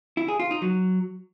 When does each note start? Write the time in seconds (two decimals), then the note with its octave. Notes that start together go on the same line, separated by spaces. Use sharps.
0.17 E4
0.28 G#4
0.40 F4
0.51 D#4
0.62 F#3